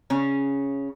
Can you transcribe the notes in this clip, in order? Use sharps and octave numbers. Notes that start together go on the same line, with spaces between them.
C#3 C#4